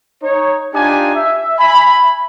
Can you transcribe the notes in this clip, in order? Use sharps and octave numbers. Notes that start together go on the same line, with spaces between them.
D#4 C#5
D4 D#4 F4 G4 G#5
E5
E5 G#5 B5